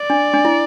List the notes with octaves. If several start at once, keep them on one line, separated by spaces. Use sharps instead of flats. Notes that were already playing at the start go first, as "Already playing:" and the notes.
Already playing: D5
D4
D4
E4